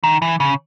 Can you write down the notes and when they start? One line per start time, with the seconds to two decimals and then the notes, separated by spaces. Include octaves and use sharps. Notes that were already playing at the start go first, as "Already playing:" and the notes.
0.04 D#3
0.22 E3
0.40 C#3